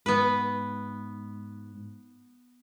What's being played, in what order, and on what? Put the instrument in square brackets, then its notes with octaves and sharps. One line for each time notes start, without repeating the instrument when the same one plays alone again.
[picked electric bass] G#2 [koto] B3 B4